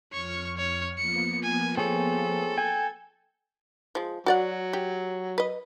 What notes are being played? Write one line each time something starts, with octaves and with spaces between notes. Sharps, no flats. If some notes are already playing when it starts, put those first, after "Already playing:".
F2 C#5 C#6 F6
C#5
F3 A#3 B3 C#7
G#5
C4 G#4 A4 C#5
G5 G#5 G#6
F3 G#3
F#3 F#4 D5 F#5
G4
B4 D#5